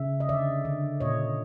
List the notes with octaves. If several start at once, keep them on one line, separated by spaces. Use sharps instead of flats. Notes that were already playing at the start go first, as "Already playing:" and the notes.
Already playing: C#3 E5
D#5
D3 D5 E5
D3
A#2 C#5 D#5